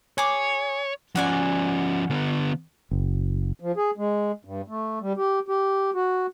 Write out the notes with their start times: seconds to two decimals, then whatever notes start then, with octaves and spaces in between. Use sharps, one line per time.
0.18 G#4 C#5 D6
1.16 F3 C#4 F#4 D5 G#5
2.10 D3 B3
2.91 F#1
3.60 F3
3.77 G#4
3.97 G#3
4.45 G2
4.68 A3
5.01 G3
5.17 G4
5.49 G4
5.94 F#4